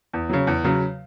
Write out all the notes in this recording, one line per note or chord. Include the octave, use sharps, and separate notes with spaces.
E2
C#3 F#3
E2
C#3 F#3